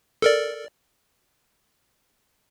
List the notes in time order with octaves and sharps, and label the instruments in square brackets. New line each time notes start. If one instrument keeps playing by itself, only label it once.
[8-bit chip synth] A4 A#4 D5